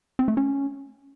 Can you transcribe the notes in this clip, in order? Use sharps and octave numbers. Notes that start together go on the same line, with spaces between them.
C4
A3
C#4